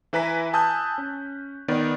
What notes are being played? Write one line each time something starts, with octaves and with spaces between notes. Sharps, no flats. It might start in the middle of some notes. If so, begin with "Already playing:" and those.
E3 E4 B4 G#5 A#5 B6
G#5 A5 D#6 E6 F#6 G6
C#4
D#3 B3 D5